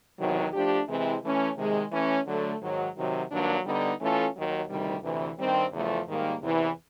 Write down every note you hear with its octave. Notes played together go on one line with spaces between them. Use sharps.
E2 C3 D#3 F#3
F3 A3 D4 G4
C3 E3 G#3 C4 E4
E3 A3 C#4
C3 D#3 G#3
E3 A3 C#4
D3 F#3 A3
G#2 D#3 F#3
C3 D#3 F#3
G2 D#3 F#3 A#3 D4
D3 G3 B3 D#4
E3 A3 C#4 F4 A4
D#2 D#3 F#3
D2 C3 D#3 G3
D2 C3 E3
G2 D#3 G3 C4
E2 C#3 F3 A3
G#2 D#3 G3 A#3
E2 C3 E3